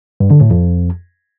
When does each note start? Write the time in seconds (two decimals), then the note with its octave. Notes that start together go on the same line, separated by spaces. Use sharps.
0.20 G2
0.31 D3
0.41 A2
0.51 F2